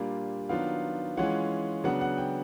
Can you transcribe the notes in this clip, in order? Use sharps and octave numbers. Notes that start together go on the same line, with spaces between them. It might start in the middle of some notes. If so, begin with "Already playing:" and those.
Already playing: A#2 G3 A#3 D4 F4
D#3 F#3 B3 D4 F4 F5
E3 G#3 C#4 F4 F#5
C#3 F#3 B3 D4 F#5
F#5
G5